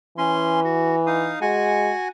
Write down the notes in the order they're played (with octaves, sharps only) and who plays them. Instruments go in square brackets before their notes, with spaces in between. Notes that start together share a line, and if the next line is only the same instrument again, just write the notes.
[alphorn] E3 [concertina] C#4 C6
[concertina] F#4
D#4 F5 D#6
[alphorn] G#3 [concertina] F#4 F#5 G#5